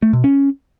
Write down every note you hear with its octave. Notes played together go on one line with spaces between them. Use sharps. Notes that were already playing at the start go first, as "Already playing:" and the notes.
A3
B2
C#4